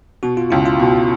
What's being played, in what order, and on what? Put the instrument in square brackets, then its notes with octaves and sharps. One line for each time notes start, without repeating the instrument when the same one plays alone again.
[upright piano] B2 [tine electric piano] F#4
[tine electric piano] F4
[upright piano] C#2 [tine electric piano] E4
[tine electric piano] F4
[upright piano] B2